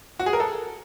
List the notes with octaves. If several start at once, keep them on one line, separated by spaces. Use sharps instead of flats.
F#4
G#4
A#4
A4